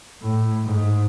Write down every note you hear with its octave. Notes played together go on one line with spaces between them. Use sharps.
A2
G#2